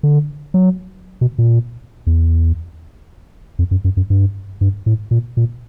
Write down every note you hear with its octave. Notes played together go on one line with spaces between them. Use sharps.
D3
F#3
B2
A#2
E2
F2
F#2
F#2
F#2
G2
G2
A2
A#2
A#2